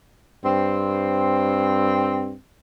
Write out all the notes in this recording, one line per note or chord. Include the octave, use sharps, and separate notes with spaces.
G2 C4